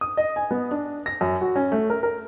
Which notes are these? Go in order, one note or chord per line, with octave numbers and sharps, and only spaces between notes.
D#6
D#5
G#5
B3
D4
A#6
F#2
F#4
C#4
A3
A#4
A#4